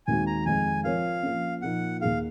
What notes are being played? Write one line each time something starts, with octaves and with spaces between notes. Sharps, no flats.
D#2 D#3 G#3 C4 F#4 G#5
A#5
F2 D#3 G#3 C4 G#5
F3 C4 F4 A#4 C#5 F5
F3 A#3 C#4
A#2 F3 A#3 D#4 F#5
D#2 D#3 A#3 D#4 G#4 F5